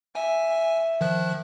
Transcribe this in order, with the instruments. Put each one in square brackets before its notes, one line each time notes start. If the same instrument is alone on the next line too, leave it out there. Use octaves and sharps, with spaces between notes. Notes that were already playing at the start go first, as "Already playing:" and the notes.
[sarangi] E5 [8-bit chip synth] G#5
[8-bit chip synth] D#3 F3 F#6